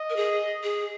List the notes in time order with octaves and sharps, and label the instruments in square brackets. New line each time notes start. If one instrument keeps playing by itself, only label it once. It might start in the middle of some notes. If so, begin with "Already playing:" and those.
Already playing: [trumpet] D#5
[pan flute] A#4
G#4
G#4